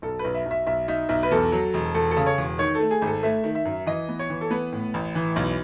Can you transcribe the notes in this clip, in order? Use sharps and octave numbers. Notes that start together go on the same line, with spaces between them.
B1 A4
B4
B1
E5
B1
E5
B1 E5
D#4 E5
B1 E5
B4
E2 A4
F#3
E1
E1 A4
A4
C#3
C#5
E1
D#3 C#5
A4
A3
G#4
G#1
A4
A3 E5
D#3
E5
F#2
E3 D#5
B3
C#5
E3
A4
B3 B4
A2
A1
E3
B1